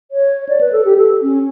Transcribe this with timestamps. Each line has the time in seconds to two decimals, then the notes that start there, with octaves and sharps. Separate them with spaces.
0.11 C#5
0.49 D5
0.61 B4
0.73 A4
0.85 G4
0.98 A4
1.22 C#4